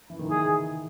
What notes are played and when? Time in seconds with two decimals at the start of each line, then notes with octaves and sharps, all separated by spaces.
0.10 E3
0.19 D#3
0.30 G#4